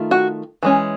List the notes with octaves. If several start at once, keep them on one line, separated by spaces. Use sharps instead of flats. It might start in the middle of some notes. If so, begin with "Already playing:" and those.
Already playing: D#3 A3 F4
F#4
E3 G#3 C#4